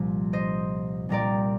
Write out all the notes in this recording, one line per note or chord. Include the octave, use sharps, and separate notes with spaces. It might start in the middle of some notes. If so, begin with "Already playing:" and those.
Already playing: C2 A#2 F3
C5 D#5
C2 A#2 G3 A#4 D5